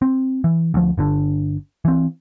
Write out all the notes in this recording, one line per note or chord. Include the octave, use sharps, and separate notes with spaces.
C4
E3
D2 F3
G1 D3 D4
E3 C4